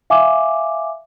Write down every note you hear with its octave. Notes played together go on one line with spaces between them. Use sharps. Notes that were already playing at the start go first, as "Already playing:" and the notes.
E5 F5 G#5 D6